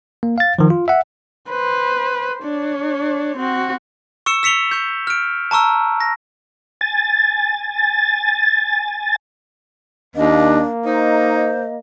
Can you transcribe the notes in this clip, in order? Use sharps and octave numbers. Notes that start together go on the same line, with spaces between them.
A#3
F5 A6
D#3 F3
F4
E5 F#5
B4 C5
D4 C#5
C4 F#4
C#6 E6 C#7 E7
E6 B6 C#7 F7 G7
C#6 G6
F6 D7
A5 A#5 C#6 E6
A#6
G#5 A6
D#2 A#3 D4 D#5
D#4 C5 D#5